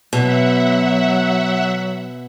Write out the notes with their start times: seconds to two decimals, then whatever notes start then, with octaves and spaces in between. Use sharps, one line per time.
0.13 B2 F#3 E5 F#5